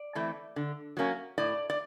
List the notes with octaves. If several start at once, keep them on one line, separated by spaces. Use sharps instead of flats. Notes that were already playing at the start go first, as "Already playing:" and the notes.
Already playing: D5
E3 A3 C4
D3
F#3 A#3 C#4
A2 D5
D5